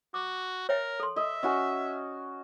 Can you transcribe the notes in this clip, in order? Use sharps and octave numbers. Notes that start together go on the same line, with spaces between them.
F#4 D6
A#4 C#5 E5 G5
A4 C6
D#5 E5
C#4 F#4 G#5